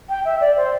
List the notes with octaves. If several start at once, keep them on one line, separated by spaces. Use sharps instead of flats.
G5
E5
D5
C5